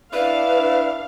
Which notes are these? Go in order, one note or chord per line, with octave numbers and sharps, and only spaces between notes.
D4 E4 B4 D5 F5